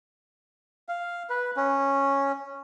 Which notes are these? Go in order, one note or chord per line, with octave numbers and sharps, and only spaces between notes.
F5
B4
C#4